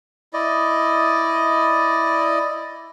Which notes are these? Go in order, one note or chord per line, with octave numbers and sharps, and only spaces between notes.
E4 D5 D#5